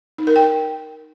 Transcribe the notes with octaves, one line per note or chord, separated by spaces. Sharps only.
D#4
A#4
G5